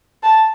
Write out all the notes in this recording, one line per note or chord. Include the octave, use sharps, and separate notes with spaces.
A5